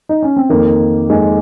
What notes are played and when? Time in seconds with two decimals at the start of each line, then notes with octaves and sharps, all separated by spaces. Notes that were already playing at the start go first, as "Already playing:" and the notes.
0.09 D#4
0.23 C#4
0.37 C4
0.49 F2 D#3 A#3
1.10 F2 D#3 G#3